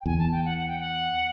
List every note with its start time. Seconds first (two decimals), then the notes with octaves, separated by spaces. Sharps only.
0.01 G5
0.06 E2 G#5
0.19 A5
0.32 G5
0.45 F#5
0.57 F#5
0.68 G5
0.79 F#5